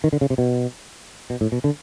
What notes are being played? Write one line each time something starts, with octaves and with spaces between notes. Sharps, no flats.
D#3
D3
C#3
C3
B2
B2
A2
B2
D3